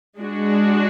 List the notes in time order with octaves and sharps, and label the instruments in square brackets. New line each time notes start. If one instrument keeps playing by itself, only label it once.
[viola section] G#3 D4 F#4